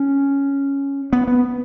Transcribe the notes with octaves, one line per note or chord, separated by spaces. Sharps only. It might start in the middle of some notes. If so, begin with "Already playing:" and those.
Already playing: C#4
B3
B3